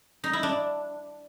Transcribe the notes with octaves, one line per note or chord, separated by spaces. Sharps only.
D#4
E4
D4